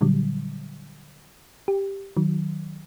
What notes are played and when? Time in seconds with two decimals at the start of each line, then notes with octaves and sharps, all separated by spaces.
0.01 A#2 D3 F#3 G3
1.68 G4
2.17 D#3 F#3